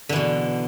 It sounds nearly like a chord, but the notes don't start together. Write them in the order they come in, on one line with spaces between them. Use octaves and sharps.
D3 E3 B2